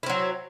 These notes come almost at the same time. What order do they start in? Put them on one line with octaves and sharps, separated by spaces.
E4 C4 F#3